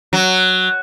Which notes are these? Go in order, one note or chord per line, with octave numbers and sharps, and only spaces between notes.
F#3